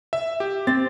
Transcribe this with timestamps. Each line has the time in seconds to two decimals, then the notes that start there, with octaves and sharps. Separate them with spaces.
0.13 E5
0.40 G4
0.67 C4 A6